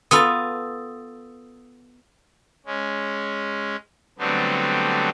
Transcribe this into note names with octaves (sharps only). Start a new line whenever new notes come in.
B3 F4 A4 D#6 E6 A6
G#3 C#4
D3 F#3 G3 A3 B3 C4